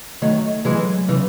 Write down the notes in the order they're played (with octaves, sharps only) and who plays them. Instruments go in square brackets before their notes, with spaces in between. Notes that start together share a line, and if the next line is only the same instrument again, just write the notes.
[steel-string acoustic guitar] D#3 F#3 [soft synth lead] A3
[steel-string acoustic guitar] E3 G#3 [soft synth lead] F#3
[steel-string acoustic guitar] C#3 E3